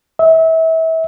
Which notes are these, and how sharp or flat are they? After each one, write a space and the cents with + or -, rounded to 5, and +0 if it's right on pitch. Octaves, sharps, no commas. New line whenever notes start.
E5 -30